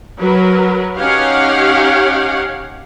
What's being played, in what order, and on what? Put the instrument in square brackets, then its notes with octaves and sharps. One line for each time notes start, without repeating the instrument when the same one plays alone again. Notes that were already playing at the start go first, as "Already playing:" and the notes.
[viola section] F#3 A#4 B4
C#4 D#4 G4 C#5 F5 F#5